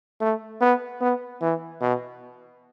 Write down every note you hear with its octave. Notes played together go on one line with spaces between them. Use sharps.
A3
B3
B3
E3
B2